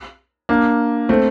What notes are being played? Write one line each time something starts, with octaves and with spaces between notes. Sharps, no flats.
A#3 D4
A3 C4